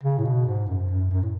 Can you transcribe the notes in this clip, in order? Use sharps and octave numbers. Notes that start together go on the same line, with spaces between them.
C#3
A2
B2
G#2
F#2
F#2
F#2
A2